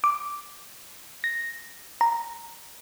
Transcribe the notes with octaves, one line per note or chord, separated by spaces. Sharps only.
D6
A#6
A#5